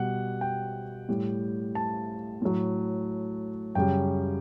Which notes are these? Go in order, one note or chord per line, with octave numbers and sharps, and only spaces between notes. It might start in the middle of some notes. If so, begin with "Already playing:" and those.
Already playing: B2 G3 F#5
G5
A2 G3
A5
A2 F#3
F#2 C#3 G3 G5